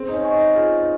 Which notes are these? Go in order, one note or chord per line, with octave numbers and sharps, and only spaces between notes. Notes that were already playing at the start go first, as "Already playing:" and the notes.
Already playing: C4 G#4
D#4
C#4
D#5 G#5 C#6
D#4
F4 G#4
D#4